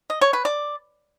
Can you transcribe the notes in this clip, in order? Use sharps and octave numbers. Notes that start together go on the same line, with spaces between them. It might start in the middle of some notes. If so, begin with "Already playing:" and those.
D#5
C#5
B4
D5